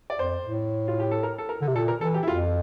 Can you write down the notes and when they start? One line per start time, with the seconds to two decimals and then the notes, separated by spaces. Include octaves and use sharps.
0.10 D5
0.19 F2 C5
0.45 A2
0.88 F4
0.99 G4
1.11 A4
1.23 A#4
1.38 A4
1.49 A#4
1.62 D3
1.68 C3
1.75 A#2 A4
1.88 A#4
2.01 E3 A4
2.14 G4
2.23 E4
2.28 F2 F4